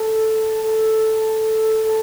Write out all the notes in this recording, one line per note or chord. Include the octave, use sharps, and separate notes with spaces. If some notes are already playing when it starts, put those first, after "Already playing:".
Already playing: A4
A4
A4